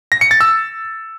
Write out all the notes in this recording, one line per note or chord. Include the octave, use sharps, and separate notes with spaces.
A#6
C#7
A6
E6